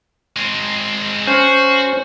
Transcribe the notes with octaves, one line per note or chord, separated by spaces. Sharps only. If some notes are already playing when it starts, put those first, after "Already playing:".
G#3 C4
C#4 F#4 C5